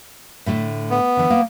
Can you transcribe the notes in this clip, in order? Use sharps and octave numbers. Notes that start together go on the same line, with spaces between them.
A2 D3 A3
B3
D3 E3
A#3 F5